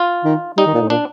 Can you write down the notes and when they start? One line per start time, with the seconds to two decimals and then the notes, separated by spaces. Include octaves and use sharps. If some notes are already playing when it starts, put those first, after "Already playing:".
Already playing: F4
0.24 D#3
0.57 G3 D#4
0.66 D#3
0.74 A#2
0.81 A2
0.90 A#2 D4